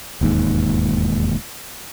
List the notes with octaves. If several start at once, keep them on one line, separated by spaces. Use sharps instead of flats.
E1 D#2 G#2